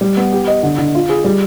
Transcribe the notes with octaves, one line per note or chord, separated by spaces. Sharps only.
G3
B3
G4
D#5
D3
D3
F4
G#4
G3